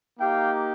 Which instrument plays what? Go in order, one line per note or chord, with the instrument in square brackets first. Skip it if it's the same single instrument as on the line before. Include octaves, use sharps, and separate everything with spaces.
[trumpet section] A#3 D#4 G4 F5 G5